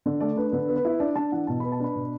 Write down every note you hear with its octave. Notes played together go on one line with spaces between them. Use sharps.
D3
A3 D5
D4 B4
D3 B4
B3
B4
E4
D4 D5
D4 A5
E3 F#5
B2 A5
B3 B5
A5
D4 B5
B2